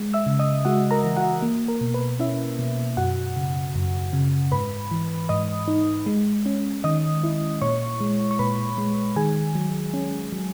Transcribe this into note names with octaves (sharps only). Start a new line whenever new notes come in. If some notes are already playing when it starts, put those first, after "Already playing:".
Already playing: G#3
E5 E6
C#3
D#5 D#6
G#3 F#4 F#5
A#4 A#5
E3
F#4 F#5
A#3
A#4
B2
B4
C#4 E4 E5
B2
F#2 F#4 F#5
C#3
F#2
C#3
G#2 B4 B5
E3
G#2 D#5 D#6
D#4
G#3
C#4
D#3 D#5 D#6
E4
A#2 C#5 C#6
G#3
C#6
A#2 B4 B5
G#3
D#3 G#4 G#5
F#3
C#4
F#3